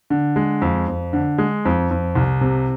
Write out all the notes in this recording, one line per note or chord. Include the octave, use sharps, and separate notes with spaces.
D3
G#3
F2
F2
D3
G#3
F2
F2
C2
C3